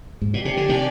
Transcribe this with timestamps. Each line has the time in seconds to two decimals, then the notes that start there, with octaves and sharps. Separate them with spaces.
0.21 G#2
0.34 A#2
0.42 C3 D4 G4 D5 G#5
0.57 D3
0.69 C3 D#3